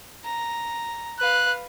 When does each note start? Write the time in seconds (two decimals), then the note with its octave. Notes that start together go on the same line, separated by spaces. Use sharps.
0.25 A#5
1.20 B4 F5 F#6